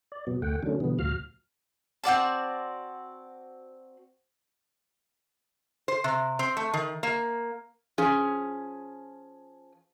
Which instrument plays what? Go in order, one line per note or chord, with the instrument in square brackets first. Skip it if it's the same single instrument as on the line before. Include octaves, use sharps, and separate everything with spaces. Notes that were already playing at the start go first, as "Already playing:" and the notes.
[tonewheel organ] D5
B2 F#3 B3
D2 A3 F#5 G5
D3 D#3 F#3 A3 C#4 D4
B2 D3 E3 G3 B3
D2 A2 F3 F#4 F5 F6
[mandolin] C4 F#4 D5 A5
[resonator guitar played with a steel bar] C5
C3
C4
A3
D#3
A#3
F3 C#4 G#4